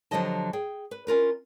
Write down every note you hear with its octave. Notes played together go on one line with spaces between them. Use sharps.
D3 F3 F#3 G4 D#5 A5
G#4 G5
B4
C#4 F4 A#4 B4